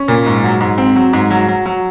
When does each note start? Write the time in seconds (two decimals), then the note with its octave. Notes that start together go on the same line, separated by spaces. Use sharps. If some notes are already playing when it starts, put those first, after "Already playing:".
Already playing: C#4
0.08 A#2
0.26 G#2
0.44 F#3
0.61 G#2
0.78 C4
0.96 F#3
1.13 G#2
1.31 F#3
1.48 F#3
1.66 F#3